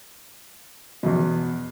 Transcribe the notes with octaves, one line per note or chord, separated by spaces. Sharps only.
E2 B2